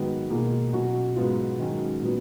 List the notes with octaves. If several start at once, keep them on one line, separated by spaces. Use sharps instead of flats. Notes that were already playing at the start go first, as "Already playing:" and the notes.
Already playing: G#2 D#3 F#3 B3
B2 A#3 F4 G#4
B2 F#3 C#4 F#4
G#2 F#3 B3 F4
G#2 D#3 F#3 C#4
A#2 F#3 B3